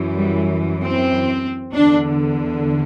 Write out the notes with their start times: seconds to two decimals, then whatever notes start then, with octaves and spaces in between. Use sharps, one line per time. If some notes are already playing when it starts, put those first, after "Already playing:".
Already playing: F#2 E3
0.18 G3
0.81 C4
1.75 E2 D3 D4